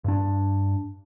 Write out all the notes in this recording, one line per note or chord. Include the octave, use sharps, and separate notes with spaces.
G2 D4